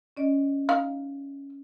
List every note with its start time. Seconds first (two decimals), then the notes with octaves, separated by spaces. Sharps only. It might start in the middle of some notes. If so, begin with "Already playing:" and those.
0.17 C#4 D5 D#5
0.69 D#4 F5